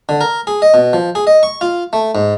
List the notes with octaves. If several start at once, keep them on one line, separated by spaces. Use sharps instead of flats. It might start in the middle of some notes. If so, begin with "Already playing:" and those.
D3
A#4
G#4
D#5
B2
F3
G#4
D#5
C#6
F4
A3
G#2